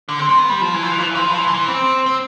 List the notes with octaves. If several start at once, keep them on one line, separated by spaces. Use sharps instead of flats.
D3
C4
C4
B3
G3
F3
E3
F3
E3
F3
E3
F3
E3
F3
E3
F3
E3
C4
C4